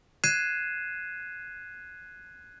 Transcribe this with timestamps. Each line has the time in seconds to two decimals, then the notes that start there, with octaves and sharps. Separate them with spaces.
0.24 F#6 G#6 C7 D#7 E7